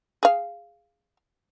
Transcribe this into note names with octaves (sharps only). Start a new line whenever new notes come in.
G#4 F5